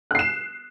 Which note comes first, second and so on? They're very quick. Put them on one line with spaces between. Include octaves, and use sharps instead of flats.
F#6 C7 E7